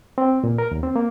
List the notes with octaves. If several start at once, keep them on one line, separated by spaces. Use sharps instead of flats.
C4
A#2
A#4
D#2
C4
A#3